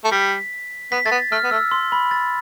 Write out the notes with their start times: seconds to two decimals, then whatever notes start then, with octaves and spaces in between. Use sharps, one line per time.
0.04 A3
0.11 G3 B6
0.92 B3 B6
1.06 A3 A6
1.11 B3
1.32 A3 F6
1.44 B3
1.51 A3 E6
1.71 C6
1.92 B5
2.11 A6